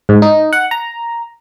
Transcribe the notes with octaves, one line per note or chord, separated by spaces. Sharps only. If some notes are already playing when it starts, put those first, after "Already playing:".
G#2
D#4
F#5
A#5